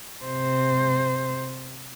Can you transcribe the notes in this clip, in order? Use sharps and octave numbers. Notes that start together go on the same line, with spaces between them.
C3 C5